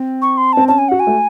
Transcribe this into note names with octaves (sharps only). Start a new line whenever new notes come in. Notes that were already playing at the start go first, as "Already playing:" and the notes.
Already playing: C4
C#6
C6
C4 A5
C#4 A5
G#5
F#4 F#5
G#5
A3